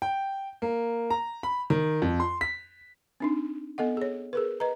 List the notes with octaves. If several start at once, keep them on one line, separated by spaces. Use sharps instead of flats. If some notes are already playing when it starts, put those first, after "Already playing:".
G5
A#3
A#5
B5
D#3
F2
C6
B6
C4 D4 D#4
B3 A4 D#5 F#5
G#4 C#5
G#4 A#4 B4
B4 D#5 A#5